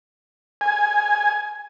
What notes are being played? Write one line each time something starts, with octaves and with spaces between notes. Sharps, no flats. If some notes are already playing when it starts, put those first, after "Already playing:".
G#5